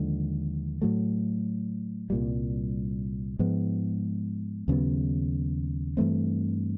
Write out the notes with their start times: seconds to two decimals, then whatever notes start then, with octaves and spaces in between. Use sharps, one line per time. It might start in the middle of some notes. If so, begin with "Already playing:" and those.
Already playing: D#2 D3 F3 G#3
0.82 A2 F#3 A3
2.10 C2 A#2 G3
3.39 G#2 F3 G#3 B3
4.68 D#2 C#3 F#3 B3
5.97 G2 E3 A3 C4